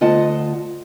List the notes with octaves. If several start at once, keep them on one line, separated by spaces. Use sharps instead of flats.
D2 F4 D#5 F#5 A5